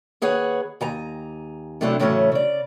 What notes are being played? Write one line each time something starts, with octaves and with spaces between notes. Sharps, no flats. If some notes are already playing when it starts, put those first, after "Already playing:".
D#2 G#4 B4 C#5 F#5
D#2 G#5 A#5
C3 F#3 A3 D4 E4
A2 C#3 E3 F#3 A3 C#4
C#3 D5